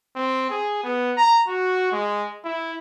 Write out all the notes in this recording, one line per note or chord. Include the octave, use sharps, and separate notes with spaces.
C4
G#4
B3
A#5
F#4
G#3
E4